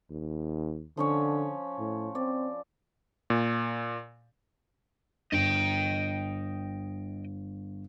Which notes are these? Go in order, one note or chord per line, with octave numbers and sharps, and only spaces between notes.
D#2
D3 F3 C#4 C#5
A2
C4 D5
A#2
G1 D#5 G5